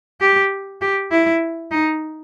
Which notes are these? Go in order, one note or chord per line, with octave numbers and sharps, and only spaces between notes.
G4
G4
E4
D#4